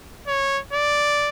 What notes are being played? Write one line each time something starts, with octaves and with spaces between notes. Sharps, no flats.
C#5
D5